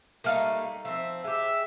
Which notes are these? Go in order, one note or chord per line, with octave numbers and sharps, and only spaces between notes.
G3 A3 A#3 D#4 F5 D#6
F3 C4 E5
G#3 G4 E5